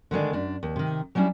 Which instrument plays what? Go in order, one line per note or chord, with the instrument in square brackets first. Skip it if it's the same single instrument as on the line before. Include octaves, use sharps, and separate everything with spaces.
[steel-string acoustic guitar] D3 D#3 G#3 D4
F#2 D4
D#2
C3 D#3
F#3 G3 C#4 D4 E4